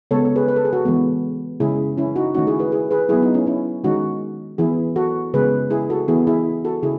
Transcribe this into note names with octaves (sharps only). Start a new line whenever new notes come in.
C#3 G#3 B3 A4 C#5
A4
G#4 B4
B4
A4
G#4
F#4 A4
E3 G#3 B3
C#3 G#3 C#4 E4 G#4
C#4 E4
D#4 F#4
D#3 A3 C#4 D#4 F#4
E4 G#4
G#4 B4
E4 G#4
G#4 B4
F#3 B3 E4 G#4
D#4
C#4 E4
C#4 E4
D#3 G#3 C#4 D#4 F#4
E3 B3 E4 G#4
F#4 A4
C#3 G#3 B3 G#4 B4
E4 G#4
F#4 A4
E3 B3 E4 G#4
E4 G#4
F#4 A4
C#3 E4 G#4